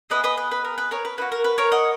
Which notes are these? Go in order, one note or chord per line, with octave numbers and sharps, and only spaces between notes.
B3 E4 G#4 B4 D#5
B4 D#5
B4
B4
A#4
B4
A#4 C#5
B4
A#3 D#4 F#4 B4
A#4
B4
A#4 C#5
D#5 F#5